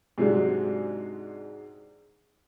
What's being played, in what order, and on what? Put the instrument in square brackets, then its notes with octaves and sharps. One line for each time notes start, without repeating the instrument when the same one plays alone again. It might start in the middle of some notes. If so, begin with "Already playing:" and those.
[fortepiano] G#2 C3 F#3 G#3 D4